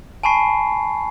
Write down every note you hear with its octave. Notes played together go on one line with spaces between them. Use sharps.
G#5 A5 B5 C#6 C7